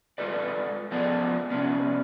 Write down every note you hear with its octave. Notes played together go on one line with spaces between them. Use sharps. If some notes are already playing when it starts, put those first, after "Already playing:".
G#3 F4 A4 B4 D5
F3 G#3 B3 D5 A5
C3 G#3 B3 C#4 D4